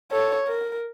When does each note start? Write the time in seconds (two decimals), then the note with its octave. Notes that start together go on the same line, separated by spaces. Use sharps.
0.12 A4 C#5
0.48 A#4